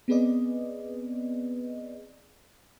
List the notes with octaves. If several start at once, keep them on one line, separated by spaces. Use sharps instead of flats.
B3 C4 G#4 B4 D5 D#5